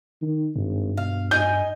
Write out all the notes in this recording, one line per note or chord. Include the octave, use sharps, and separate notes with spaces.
D#3
G#1 G2
B2 F5
D#4 G#5 G6